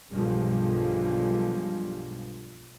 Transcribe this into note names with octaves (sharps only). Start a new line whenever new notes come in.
B1 G2 D3 F3 G3 G#3